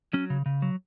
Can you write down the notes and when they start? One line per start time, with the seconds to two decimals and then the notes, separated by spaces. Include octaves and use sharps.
0.13 F#3 C#4
0.30 C#3
0.46 C#3
0.62 F#3